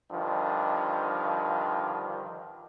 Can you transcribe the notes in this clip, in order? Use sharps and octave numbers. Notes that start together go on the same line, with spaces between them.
G2 D3 D#3 F3